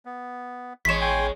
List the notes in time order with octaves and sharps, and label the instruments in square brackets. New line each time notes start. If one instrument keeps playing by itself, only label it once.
[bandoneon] B3
[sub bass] A1 [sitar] E2 G#3 C#5 [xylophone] B6 E7
[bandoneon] G5 G#5 C6